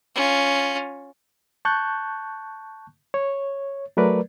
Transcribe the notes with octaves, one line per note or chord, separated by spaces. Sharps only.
C#4 F4
A5 C#6 F#6 G6
C#5
F#3 A3 A#4 B4 D5